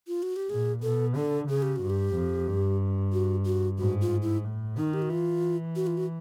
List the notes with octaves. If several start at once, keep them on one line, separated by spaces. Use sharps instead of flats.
F4
F#4
G4
A#2 G#4
B2 A4
D3 A4
C#3 G#4
G4
F#4
G2
G4
F2
G2
F#4
F#4
G#2 F#4
F4
E4
A2
D#3 D#4
G4
F#4
E3 F4
F#4
F4
F#4